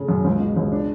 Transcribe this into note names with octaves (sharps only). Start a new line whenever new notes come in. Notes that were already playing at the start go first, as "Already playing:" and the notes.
Already playing: C#3 A3
F#2
C#2
B2
C#2
D4